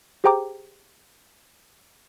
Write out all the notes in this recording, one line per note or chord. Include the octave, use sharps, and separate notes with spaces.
G4 G#4 C5 G5 A#5 D6